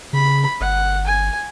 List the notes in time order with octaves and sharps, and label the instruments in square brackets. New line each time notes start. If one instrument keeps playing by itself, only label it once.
[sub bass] C#3 [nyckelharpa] B5
[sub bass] G1 [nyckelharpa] F#5
[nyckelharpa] G#5